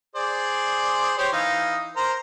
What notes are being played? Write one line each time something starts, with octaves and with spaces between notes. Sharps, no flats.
G#4 C5 D5
G4 C5 C#5
E3 D#4 F5
A#4 C5 A#5